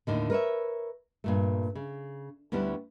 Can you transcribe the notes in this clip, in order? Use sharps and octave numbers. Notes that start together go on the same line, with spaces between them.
D#2 A2 D3 D#3
A#4 B4 C#5 E5
G2 A#2 A3
C#3
D2 G3 B3 C#4 D4 E4